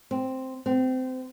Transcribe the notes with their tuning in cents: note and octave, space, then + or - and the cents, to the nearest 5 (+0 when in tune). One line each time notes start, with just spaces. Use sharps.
C4 +0
C4 -25